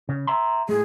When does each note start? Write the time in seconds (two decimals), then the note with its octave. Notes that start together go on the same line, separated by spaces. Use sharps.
0.09 C#3
0.27 E5 A#5 C6
0.69 A2 G#3 G#4